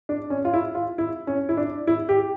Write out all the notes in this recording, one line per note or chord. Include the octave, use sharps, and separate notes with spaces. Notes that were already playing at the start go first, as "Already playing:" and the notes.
D4
C#4
F4
E4
F4
E4
C#4
E4
D4
E4
G4